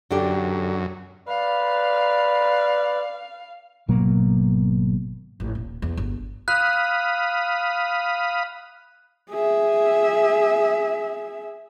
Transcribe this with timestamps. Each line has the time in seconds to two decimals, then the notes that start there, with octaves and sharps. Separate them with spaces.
0.11 F#2 D3 D4 G4
1.28 B4 D5 F5
3.88 G#1 B2 F#3 A#3
5.40 A1
5.55 D#1
5.82 E2
5.97 G1
6.48 F5 B5 D#6 F#6
9.30 G#4 E5